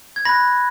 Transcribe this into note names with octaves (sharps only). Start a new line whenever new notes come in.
G#6
B5 F#6 A#6